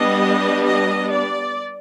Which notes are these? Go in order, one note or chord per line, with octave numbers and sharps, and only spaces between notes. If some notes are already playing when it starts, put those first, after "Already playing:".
Already playing: G3 B3 D4 D#5
D#5
D5